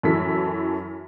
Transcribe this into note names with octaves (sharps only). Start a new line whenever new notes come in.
F#2 E3 A4 B6